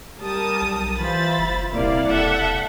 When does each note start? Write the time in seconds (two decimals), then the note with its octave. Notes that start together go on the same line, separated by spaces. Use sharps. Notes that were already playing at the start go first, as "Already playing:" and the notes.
0.19 G3 A#4 A5 D#6
0.62 B1
1.00 E3 F4 C5 E5 B5 A6
1.38 F#1
1.73 D#1 C2 C3 A#3 E4 D5 F5
2.08 E1 A4 E5 F#5